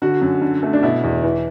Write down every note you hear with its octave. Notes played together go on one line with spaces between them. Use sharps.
D3 F#4
F#2
D3
A3
D4
B2 E4
E2
E3